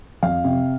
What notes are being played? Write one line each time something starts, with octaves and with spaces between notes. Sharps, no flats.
F2 F5
C3